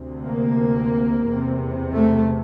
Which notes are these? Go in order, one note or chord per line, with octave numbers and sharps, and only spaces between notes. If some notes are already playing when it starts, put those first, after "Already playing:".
Already playing: D2 C3
A#3
E2 C3
A3